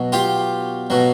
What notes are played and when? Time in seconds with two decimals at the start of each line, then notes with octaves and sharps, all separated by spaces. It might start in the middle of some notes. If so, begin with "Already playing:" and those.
Already playing: B2 F#3
0.12 F4 G4
0.90 B2 F#3